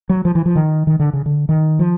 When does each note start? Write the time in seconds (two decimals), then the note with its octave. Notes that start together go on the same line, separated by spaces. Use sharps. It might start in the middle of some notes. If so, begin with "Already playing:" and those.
0.09 F#3
0.25 F3
0.35 E3
0.46 F3
0.55 D#3
0.87 D#3
0.99 D3
1.13 C#3
1.26 D3
1.49 D#3
1.79 F3